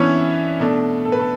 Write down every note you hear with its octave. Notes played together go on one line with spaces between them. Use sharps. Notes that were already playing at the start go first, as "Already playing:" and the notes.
Already playing: E3 B3 C#4 D4 E4 C#5 E5
B2 A3 D4
A4
B4
A3 A4